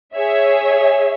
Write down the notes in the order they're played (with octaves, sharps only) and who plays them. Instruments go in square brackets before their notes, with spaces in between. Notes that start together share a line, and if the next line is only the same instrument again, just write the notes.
[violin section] G#4 C#5 E5